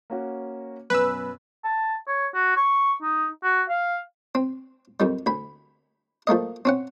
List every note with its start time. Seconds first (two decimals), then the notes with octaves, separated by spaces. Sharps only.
0.10 A#3 C#4 F#4
0.90 F#2 B2 B4 B5 E6
1.64 A5
2.07 C#5
2.34 F#4
2.56 C#6
3.02 D#4
3.43 F#4
3.69 F5
4.35 C4
5.00 F2 D#3 G3
5.26 D2 B5
6.27 F3 A3 A#3 D#5
6.65 C4 C#4 F#5